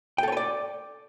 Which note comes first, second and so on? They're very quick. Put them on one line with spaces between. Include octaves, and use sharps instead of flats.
G5 A4 C#5 B4 D5